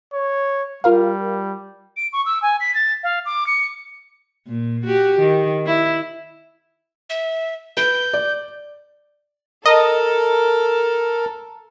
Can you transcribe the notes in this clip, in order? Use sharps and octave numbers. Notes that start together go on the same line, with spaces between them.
C#5
G3 F4 A#4 F5
D7
C#6
E6
G#5
B6
A6
F5
D6
C#7
A#2
F#4 G4
D#3
E4
E5
B4 G6
D5
A4 A#4 D#5